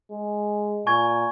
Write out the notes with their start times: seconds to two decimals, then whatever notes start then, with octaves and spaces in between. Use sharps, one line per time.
0.12 G#3
0.86 A#2 G#5 C#6 G#6